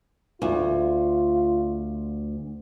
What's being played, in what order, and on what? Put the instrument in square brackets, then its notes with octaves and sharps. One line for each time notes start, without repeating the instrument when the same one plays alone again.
[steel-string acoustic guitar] D2 [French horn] F4